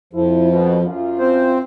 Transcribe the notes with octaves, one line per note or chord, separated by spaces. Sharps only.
F2 F3 E4
B2
F#2 F4
C4 C5